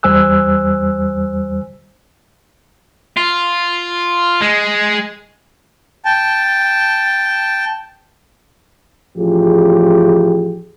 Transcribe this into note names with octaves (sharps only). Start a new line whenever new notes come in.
E2 G3 C5 G#5 E6 F#6
F4
G#3
G5 A5
A1 F3 F4 G4 G#4